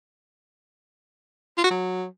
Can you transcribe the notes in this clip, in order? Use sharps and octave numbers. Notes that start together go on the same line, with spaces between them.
F4
F#4
F#3